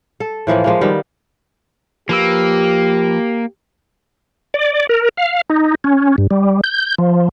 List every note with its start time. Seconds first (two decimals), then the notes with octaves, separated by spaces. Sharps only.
0.20 A4
0.47 A2 E3 F3 A#3
0.64 F3 G#3 A#3
0.81 D#3 G3 B3
2.09 F3 A#3 G4 B4 E6
4.54 D5
4.89 A#4
5.17 F5
5.50 D#4
5.84 C#4
6.18 G2
6.31 G3
6.64 G6
6.98 F3